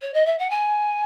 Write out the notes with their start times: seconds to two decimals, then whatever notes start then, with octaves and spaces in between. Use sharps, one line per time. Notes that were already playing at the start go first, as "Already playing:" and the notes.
0.01 C#5
0.13 D#5
0.25 E5
0.38 F#5
0.50 G#5